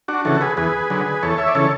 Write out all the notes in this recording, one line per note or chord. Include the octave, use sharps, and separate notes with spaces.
D4 F#4
C#3 E3 F#4 A4
G#4 B4
E2 G#4 B4
D3 F#3
E2 A4 C#5
C#5 E5
D5
C#3 E3 A4 C#5